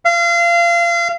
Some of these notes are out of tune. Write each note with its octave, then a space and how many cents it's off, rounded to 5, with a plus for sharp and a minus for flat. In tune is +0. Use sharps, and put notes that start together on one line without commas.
F5 -30